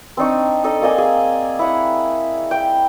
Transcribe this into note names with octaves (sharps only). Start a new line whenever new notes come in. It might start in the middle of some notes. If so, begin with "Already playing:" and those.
C4 D4 D#4 C#6
D#4 A4 D#5
A#3 D5 D#5 G#5
G#4
E4 F#5
G5